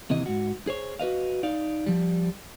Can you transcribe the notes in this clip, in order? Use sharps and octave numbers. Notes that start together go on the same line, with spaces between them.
D#2 C3 E3 D#5
G#2 F#4
G#4 C5 C#5
F#4 B4 D#5 F5
D#4 D5 F5
F3 G3